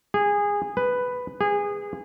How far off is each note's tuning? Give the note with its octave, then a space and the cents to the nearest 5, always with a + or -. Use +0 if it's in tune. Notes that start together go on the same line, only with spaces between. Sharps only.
G#4 -20
B4 +5
G#4 -25